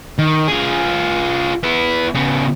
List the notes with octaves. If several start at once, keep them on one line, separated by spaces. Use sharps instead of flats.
D#3
F4 G#4
B3 E4
C#3 B3